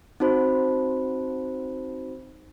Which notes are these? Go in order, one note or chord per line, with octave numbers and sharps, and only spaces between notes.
C4 D#4 F#4 C5 B5